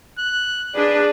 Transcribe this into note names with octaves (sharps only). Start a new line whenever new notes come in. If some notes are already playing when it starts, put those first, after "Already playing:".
F#6
D4 G#4 B4 D5